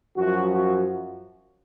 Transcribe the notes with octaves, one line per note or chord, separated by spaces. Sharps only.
F#2 F3 F#4
F#4